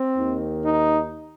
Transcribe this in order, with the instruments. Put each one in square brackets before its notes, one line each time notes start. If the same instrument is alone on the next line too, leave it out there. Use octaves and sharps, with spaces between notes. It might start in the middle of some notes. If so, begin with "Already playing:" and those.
Already playing: [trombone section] C4
D#2 D#3
D#4